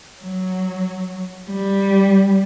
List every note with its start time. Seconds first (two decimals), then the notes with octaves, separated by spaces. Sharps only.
0.22 F#3
1.50 G3